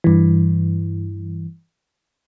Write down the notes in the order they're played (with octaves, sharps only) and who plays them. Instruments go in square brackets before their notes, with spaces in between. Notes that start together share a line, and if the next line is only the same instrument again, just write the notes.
[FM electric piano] G2 E3